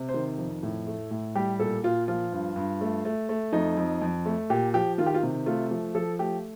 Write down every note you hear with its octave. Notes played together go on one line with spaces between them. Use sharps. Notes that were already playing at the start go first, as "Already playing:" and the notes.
Already playing: C3
C5
D#3
F2
A2
A3
A2
G3 G4
A#2 A4
A#2 F4
F3 F4
G2
G2
A3
A3
A3
F2 D#4
F2
F2
A3
A#2 G4
F3 G4
D#3 F4
G4
F4
C3
A3 F4
F3
F3 A4
A3 G4